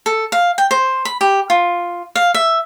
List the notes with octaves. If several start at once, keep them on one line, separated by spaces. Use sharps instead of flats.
A4
F5
G5
C5
B5
G4
F4
F5
E5